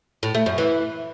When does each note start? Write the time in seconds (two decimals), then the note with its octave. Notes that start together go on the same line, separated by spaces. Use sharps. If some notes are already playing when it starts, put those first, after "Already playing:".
0.23 A2
0.35 A3
0.46 F#2
0.58 E3